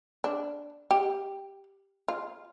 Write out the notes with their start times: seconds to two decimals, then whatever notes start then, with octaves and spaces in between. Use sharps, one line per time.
0.24 D4
0.91 G4
2.08 F4